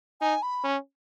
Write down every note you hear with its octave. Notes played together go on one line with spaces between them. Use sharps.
D#4 G#5
B5
C#4